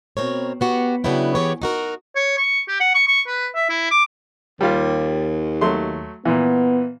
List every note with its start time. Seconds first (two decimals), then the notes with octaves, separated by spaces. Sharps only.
0.17 B2 C4 A#4 C#5
0.61 B3 F#4 G4
1.04 C#3 F#3 B3 D4 E4 G5
1.35 E3 B3 G4 G#4 C#5
1.62 D#4 F#4 A#4
2.16 C#5
2.38 C#6
2.68 G4
2.80 F#5
2.95 C#6
3.08 C#6
3.27 B4
3.56 E5
3.69 E4
3.91 D6
4.61 D#2 G3 F4 G4
5.61 F#3 A3 C6
6.26 A#2 E3 B3